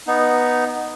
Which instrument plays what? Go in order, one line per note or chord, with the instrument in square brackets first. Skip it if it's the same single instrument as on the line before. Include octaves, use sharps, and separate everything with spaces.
[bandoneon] B3 D#4